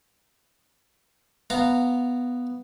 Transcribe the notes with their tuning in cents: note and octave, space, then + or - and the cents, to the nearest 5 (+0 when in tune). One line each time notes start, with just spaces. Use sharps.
B3 +0 F5 +0 A#5 -15